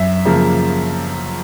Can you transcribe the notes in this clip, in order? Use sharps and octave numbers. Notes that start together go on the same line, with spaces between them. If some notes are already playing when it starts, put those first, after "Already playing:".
Already playing: F#2 E5
C#3 F3 A#3